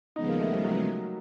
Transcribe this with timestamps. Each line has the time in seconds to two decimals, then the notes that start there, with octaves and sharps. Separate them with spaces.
0.15 D#2 C#3 F3 G#3 B3 D#4
0.28 A#3
0.40 A3
0.52 G3
0.64 F#3